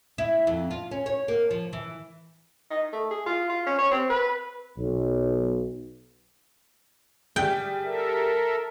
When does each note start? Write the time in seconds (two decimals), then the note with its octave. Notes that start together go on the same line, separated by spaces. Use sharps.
0.18 E4
0.47 F2
0.71 F4
0.91 C#4
1.06 C#5
1.28 A#3
1.51 F3
1.73 E3
2.71 D#4
2.92 A3
3.10 G#4
3.26 F4
3.49 F4
3.67 C#4
3.78 C#5
3.91 C4
4.10 B4
4.78 B1
7.36 G3 G#4 G5
7.84 A4 A#4 E5